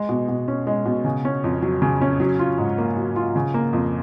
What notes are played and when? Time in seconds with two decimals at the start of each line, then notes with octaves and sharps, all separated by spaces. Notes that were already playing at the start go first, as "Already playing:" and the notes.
Already playing: G#3
0.09 B2
0.28 B2
0.48 C#4
0.67 G#3
0.86 B2
1.04 C#3
1.25 C#4
1.44 F2
1.62 F#3
1.82 C#3
2.01 C#4
2.20 F#3
2.39 F4
2.58 G#2
2.78 A#3
2.97 F#3
3.16 F4
3.35 C#3
3.54 A#3
3.73 F2